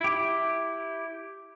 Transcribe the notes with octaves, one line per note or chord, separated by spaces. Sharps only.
E4 G4